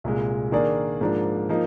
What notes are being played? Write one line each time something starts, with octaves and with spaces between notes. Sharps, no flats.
C2 A#2 G#3
D#3 A#3 D4 G#4 D5
G#2 F3 A#3 D4
F3 A#3 D#4